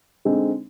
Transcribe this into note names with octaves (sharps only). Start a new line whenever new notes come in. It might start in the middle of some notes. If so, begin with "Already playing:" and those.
D3 G#3 C4 D#4